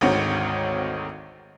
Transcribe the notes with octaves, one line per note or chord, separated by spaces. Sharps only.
G#1 D2 G#2 D#3 C4 C#5